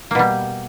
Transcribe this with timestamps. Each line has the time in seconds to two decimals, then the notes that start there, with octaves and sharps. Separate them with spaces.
0.11 A#3
0.15 B2
0.19 G3